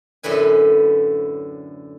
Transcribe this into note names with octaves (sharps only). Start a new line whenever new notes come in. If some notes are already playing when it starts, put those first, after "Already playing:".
F#2 A2 D3 B4 G#5